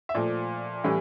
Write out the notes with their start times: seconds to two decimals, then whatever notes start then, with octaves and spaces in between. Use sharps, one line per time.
0.09 E5
0.14 A#2 F3 A3 D5
0.84 A2 E3 G3